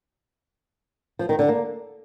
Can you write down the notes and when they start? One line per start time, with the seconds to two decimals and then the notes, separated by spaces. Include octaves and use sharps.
1.19 F3
1.29 D#3
1.39 D3
1.49 A#3